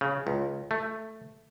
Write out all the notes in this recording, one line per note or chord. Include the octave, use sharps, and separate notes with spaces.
C#3
C#2
A3